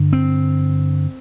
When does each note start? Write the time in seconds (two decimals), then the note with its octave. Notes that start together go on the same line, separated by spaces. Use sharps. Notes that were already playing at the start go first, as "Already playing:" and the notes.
Already playing: G2 D3
0.13 C4